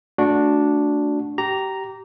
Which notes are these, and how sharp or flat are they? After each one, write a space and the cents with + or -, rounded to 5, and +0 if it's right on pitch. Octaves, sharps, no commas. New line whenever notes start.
A3 +0 D4 -5 F#4 -15
G4 -25 A#5 +0